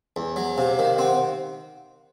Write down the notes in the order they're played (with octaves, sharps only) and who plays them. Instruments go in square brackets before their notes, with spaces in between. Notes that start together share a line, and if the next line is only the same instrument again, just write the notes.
[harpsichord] E2
F#3
[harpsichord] C3 [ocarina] F5
[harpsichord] D#3
[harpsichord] C4 [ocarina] F#5